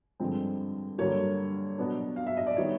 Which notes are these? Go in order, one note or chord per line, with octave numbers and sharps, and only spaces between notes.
G2 D3 F3 G#3 C4
G2 D3 F#3 A#3 C#5
B2 F#3 B3 D4
F5
E5
D#5
D5
D#3 G3 B3 C#5